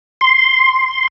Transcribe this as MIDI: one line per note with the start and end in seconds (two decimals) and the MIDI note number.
0.21 1.08 84